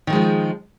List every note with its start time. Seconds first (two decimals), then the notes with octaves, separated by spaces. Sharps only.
0.07 D#3
0.10 D3
0.13 G#3
0.15 F3